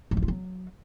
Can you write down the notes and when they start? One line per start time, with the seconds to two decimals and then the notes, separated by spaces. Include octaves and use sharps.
0.11 F#3
0.17 F3
0.23 F4
0.28 F#3